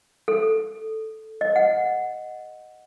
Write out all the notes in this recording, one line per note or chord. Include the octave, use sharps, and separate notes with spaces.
A4
D#5
F#5